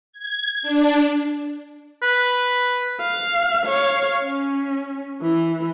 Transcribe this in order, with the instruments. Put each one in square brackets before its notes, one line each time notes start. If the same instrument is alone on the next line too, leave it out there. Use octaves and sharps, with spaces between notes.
[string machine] G#6
D4
[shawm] B4
[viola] F5
C#5 F5
C#4
E3